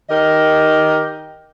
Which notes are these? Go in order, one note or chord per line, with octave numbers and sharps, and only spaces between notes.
D#3 G4 A#4 D#5